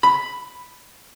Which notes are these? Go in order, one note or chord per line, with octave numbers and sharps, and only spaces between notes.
B5